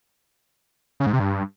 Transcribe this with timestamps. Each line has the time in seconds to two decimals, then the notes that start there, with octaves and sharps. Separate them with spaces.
1.00 C#3
1.07 G#2
1.13 C3
1.20 G2